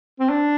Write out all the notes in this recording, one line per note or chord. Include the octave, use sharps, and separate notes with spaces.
C4
D4